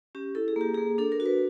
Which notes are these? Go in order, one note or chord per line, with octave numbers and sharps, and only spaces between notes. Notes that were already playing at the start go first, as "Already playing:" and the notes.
C#4 G4
E4 A4
G#4
A#3 G4
A#3 G#4
D4 A4
A#4
F#4
B4